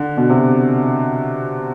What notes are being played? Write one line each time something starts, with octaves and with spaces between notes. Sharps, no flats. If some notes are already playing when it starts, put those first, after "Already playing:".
Already playing: D3
B2
C3